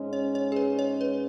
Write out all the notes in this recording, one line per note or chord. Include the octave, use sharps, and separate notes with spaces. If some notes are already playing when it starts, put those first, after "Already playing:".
Already playing: G#2 G#3 C#4
C#5
C#5
G#4
B4
C#5
B4